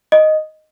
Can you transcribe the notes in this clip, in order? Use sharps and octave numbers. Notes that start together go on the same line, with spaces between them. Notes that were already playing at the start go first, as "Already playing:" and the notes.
D#5